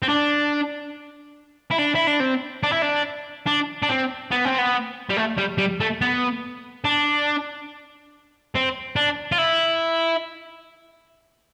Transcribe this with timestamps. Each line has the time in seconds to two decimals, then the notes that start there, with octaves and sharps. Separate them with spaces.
0.03 C4
0.09 D4
1.71 E4
1.79 D4
1.95 E4
2.07 D4
2.20 C4
2.63 D4
2.72 E4
2.82 D4
3.47 D4
3.83 D4
3.90 C4
4.31 B3
4.45 C4
4.58 B3
5.10 G3
5.17 A3
5.38 G3
5.58 G3
5.80 A3
6.01 B3
6.85 D4
8.55 C4
8.96 D4
9.32 F4
9.38 E4